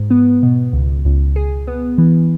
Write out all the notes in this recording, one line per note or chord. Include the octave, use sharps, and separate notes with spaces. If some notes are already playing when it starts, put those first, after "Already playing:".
Already playing: G#2
B3
B2
C#2
C#2
G#4
B3
E3